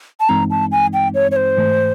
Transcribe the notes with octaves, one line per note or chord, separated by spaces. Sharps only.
A5
G2 E3 G#3 C4 D#4 A#5
A5
G#5
G5
C#5
C#5
C5
G#2 E3 A3